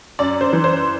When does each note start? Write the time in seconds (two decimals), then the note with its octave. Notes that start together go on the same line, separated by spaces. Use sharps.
0.19 F#2 D5
0.41 C5
0.53 E3
0.64 C5